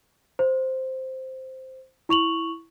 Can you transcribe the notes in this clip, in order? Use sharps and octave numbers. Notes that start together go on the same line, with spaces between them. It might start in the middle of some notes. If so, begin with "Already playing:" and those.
C5
E4 C#6 F7 F#7